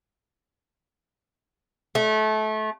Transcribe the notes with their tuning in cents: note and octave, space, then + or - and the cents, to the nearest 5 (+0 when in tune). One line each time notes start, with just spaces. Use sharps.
A3 -25